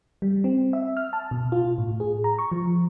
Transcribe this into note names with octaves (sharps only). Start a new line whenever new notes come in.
G3
C4
E5
F6
A5
B2
F4
A2
G#4
A#5
C#6
F3